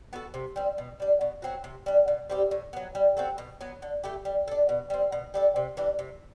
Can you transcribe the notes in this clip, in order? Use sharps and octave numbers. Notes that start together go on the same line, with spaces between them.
B3 F#4 A4
C3
G3 C4
B2
G3 D4
B2
F#3 C4 F#4
C3
G3 D4
B2
G3 C4 G4
A2
F#3 B3
G3
C4 F#4 A4
B2
F#3 B3
D3
A3 E4 G4
G3
D4 A4
B2
G3 C4
B2
G3 D4 A4
C3
E3 G3 D4
C3